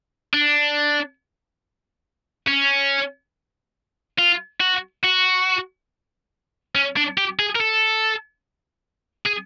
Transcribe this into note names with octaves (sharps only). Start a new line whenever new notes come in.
D4
C#4
F4
F#4
F#4
C#4
D4
G4
G#4
A#4
A4
G#4